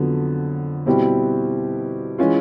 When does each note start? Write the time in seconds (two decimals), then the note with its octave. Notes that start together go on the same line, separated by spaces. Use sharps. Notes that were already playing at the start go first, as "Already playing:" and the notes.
Already playing: F2 D3 F#3 B3
0.86 B2 G3 C4 E4 G4
2.18 E3 G#3 C#4 F4